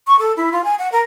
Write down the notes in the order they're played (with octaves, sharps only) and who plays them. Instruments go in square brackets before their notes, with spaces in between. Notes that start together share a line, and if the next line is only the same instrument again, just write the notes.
[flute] C#6
A4
E4
F4
G#5
F#5
A#4